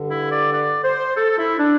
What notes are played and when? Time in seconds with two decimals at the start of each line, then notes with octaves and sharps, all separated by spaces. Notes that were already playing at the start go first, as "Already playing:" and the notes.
Already playing: G2 D3
0.10 E4
0.32 D5
0.53 D5
0.84 C5
1.16 A4
1.38 E4
1.59 D4